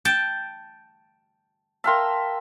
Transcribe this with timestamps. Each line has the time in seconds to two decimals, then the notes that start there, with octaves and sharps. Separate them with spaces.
0.05 G5 A5
1.84 A#4 E5 F5 G5 A5 C6